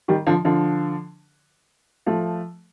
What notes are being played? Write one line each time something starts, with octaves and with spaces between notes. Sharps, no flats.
D#3 G3
D3 F3
D3 F3
F3 A3